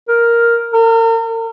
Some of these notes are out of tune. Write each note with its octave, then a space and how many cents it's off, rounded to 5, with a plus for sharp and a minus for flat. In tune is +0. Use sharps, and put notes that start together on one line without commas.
A#4 +5
A#4 -40